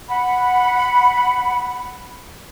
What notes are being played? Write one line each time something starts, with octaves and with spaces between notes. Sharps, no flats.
F#5 B5